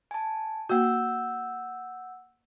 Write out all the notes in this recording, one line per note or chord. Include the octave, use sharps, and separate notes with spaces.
G#5 A5
A#3 F#4 F#5 E6 G6